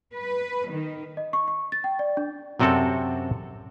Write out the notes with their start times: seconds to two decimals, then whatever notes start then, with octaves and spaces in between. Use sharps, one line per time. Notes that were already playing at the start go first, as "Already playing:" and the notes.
0.13 B4
0.71 D#3
1.17 D#5
1.33 C#6
1.48 C#6
1.72 A6
1.84 G5
1.99 D5
2.17 D4
2.60 F#2 C3 C4 F#4 A4